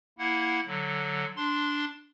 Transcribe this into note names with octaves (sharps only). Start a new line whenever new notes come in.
A#3 E4 F#5
D3 F#3
D4 C6